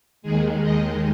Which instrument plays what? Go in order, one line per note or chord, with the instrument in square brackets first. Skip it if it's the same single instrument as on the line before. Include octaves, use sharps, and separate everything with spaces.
[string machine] D#2 D#3 G#3 G#4
D#5